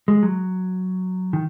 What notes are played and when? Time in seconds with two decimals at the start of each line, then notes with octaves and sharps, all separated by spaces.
0.08 G#3
0.23 F#3
1.33 D#3